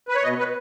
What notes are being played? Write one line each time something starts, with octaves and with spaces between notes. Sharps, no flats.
B4
C#5
B2 D#5
B4